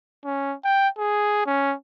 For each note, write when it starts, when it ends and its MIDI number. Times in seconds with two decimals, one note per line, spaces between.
0.25 0.55 61
0.64 0.88 79
0.98 1.46 68
1.46 1.74 61